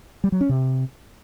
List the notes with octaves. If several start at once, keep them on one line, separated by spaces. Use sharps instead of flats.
G3
F#3
C#4
C3